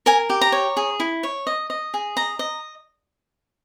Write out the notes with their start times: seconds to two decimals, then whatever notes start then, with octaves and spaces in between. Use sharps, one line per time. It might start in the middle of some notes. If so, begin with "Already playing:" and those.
0.06 A#4 G#5
0.30 G4
0.41 A#5
0.52 C#5
0.77 G#4
1.00 E4
1.23 C#5
1.47 D#5
1.70 D#5
1.94 G#4
2.17 D#5 A#5
2.39 D#5